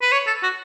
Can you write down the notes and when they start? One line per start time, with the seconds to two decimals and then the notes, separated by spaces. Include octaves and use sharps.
0.02 B4
0.12 C#5
0.27 A4
0.43 F#4